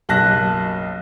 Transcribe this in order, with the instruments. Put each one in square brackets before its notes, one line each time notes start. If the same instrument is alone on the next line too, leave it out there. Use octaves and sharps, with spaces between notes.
[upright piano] F#1 B1 A5 F#6 A#6